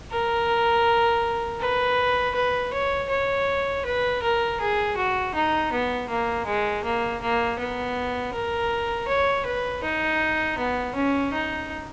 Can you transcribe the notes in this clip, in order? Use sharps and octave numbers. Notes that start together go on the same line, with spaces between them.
A#4
B4
B4
C#5
C#5
B4
A#4
G#4
F#4
D#4
B3
A#3
G#3
A#3
A#3
B3
A#4
C#5
B4
D#4
B3
C#4
D#4